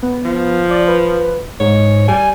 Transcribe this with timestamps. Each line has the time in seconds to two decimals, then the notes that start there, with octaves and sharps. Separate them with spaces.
0.02 B3
0.25 F3
0.70 D5
0.88 B4
1.60 G#2 C#5
2.08 G3 G#5